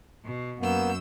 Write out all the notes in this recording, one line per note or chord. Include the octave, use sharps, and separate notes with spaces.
B2
F#2 A#3 B3 E6 G6